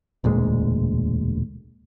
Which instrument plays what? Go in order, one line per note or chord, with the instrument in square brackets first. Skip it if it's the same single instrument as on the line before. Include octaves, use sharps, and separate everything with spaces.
[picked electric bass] E1 D2 A#2 G#3